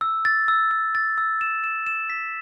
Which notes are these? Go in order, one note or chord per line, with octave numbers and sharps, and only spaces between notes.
E6
A6
E6
E6
A6
E6
E7
E7
E7
B6